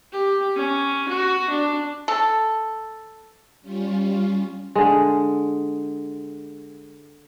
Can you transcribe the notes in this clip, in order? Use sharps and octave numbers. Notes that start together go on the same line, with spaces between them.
G4
C#4
F#4
D4
A4
G3 C#4 F4
D3 G#3